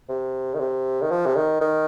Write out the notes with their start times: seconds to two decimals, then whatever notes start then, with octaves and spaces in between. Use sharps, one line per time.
0.09 C3
0.54 D#3
0.60 C3
1.02 D#3
1.11 F3
1.26 C3
1.36 D#3
1.61 D#3